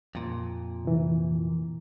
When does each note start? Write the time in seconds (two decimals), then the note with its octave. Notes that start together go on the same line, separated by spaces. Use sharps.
0.15 F2 A#2
0.85 C3 E3